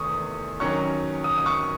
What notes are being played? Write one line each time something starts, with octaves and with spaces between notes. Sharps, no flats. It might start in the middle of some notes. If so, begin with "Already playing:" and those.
Already playing: E2 C3 D#3 A3 C#6 D#6
D#3 F#3 C#4 C#6
D#6
D#6
C#6